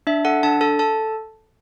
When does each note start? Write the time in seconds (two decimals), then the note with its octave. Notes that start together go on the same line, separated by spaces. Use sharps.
0.07 D4 E5
0.25 A4 F#5
0.43 D4 A5
0.61 A4 A5
0.79 A4 A5